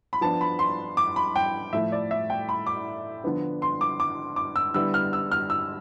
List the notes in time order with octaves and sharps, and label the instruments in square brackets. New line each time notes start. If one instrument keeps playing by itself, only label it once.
[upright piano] B5
F3 B3 D4 A5
B5
C6
D6
B5
G5
A2 F3 A3 E4 E5
D5
E5
G5
B5
D6
D3 F3 B3 D4
C6
D6
D6
D6
E6
D3 G3 B3 E4 E6
F6
E6
F6
E6